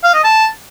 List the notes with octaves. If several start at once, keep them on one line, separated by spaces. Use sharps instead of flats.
F5
D#5
A5